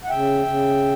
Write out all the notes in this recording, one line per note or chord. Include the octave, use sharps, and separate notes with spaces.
F#5
C#3 E5 G5
C#3